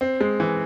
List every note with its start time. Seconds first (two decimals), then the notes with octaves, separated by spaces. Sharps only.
0.01 C4
0.21 G#3
0.40 E3